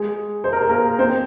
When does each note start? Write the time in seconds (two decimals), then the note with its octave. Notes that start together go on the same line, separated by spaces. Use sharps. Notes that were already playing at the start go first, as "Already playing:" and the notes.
Already playing: G#3 G#4
0.44 C5
0.53 A#4
0.61 G#4
0.69 A#3 A#4
0.99 C4 C5